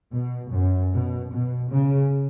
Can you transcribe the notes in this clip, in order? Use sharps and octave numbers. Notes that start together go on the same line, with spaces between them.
B2
F#2
B2
B2
C#3